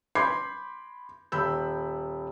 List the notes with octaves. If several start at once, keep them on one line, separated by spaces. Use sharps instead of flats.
B5 C6 D6 G6 G#6 C7
D#1 B5 E6 G6